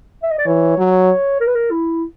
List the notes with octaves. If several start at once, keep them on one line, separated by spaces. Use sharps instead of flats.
E5
D#5
D5
E3 C#5
F#3
A#4
B4
A#4
E4